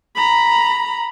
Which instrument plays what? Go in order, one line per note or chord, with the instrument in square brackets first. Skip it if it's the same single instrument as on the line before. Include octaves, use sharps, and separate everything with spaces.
[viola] A#5 B5